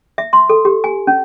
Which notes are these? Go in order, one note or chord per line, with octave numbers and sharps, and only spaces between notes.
E5
C6
A4
G4
G#5
C#4